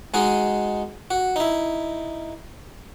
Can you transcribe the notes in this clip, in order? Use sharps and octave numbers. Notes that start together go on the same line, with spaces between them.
G#3 D#4 F#4 G#4
F#4
D#4 E4